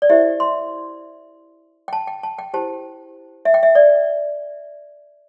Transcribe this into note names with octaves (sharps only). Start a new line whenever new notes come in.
D5
E4 G4 C5 E5
C6
G5
A5
G5
A5
G5
E4 G4 C5 A5
E5
G5
E5
D5